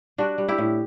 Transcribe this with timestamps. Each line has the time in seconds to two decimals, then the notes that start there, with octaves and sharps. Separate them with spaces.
0.18 G3 D4 F#4
0.38 G3
0.48 E4 G4
0.58 A2